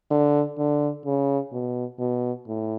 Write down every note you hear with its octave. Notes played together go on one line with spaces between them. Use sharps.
D3
D3
C#3
B2
B2
A2